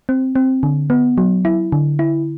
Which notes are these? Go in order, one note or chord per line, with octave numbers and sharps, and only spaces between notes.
C4
C4
D3
B3
F#3
E4
D3
E4